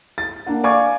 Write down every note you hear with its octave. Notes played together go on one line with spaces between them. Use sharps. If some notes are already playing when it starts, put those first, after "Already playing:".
A6
A#3 D4 F#5
D5 F5 G#5 C#6 D6 G#6